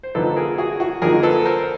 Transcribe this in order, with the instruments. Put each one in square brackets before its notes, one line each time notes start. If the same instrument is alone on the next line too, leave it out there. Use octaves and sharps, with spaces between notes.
[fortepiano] C5
F2 D3 F3 A#3 D#4 A4 B4
G#4 A#4
F#4 G#4
F#4
F2 D3 F3 A#3 D#4 G#4 A#4
A4 B4
A#4 C5